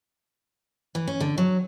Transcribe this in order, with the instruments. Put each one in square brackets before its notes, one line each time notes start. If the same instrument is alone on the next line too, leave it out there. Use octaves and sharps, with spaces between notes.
[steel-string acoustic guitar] E3
C#4
D3
F#3